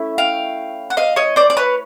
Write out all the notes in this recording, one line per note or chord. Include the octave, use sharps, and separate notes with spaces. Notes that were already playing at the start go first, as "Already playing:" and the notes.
Already playing: A3 C#4 E4
F5 G5
F#5
D#5 F5
C#5 D#5
C5 D5
D5
B4 C#5